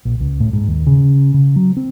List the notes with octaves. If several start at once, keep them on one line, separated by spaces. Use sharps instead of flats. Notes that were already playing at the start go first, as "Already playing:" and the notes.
A#1
C#2
A2
G#2
D#2
C#3
C#3
F#3
C4